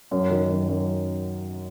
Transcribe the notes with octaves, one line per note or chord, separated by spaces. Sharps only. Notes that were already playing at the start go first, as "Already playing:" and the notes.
F#2
D#3
F#2
F#2